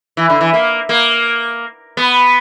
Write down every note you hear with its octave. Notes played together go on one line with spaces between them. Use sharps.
E3
D3
E3
A#3
A#3
B3